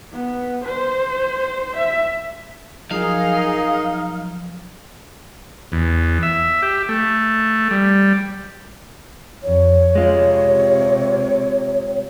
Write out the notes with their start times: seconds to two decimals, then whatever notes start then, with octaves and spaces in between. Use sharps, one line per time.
0.12 B3
0.64 C5
1.76 E5
2.91 F3 F#3 D#4 G#4 A#4 F5 D#6
5.72 E2
6.23 E5
6.62 G4
6.89 A3
7.71 G3
9.43 F2 C#5
9.95 C3 G#3 F4